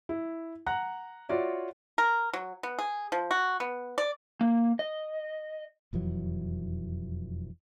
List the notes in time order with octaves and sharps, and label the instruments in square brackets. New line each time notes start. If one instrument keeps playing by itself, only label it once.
[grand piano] E4
F#5 A#5 F#6
F4 F#4 C#5 D5 E5
[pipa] A#4
F#3
B3
G#4
F3
F#4
B3
D5
[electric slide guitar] A#3
D#5
[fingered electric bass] E1 F2 E3 F#3